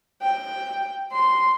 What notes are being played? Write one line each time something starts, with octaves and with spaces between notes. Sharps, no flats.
G5
C6